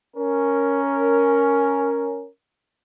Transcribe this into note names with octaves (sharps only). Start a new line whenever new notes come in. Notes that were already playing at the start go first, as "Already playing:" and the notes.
C#4 A#4